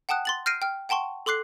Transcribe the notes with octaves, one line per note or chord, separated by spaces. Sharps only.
F#5 G5 A5 D#6 F#6
C6 A6 F#7
F6 G6 A#6 C7 D7 D#7
G5 F6
F#5 G5 A5 C6 C#6
A4 C6 D6 F#6 C7